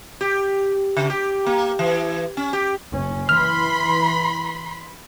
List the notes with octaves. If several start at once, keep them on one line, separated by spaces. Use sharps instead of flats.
G4
C#3
G4
A#3
E3
C#4
G4
F#1 C#4
E3 B5 C6 F6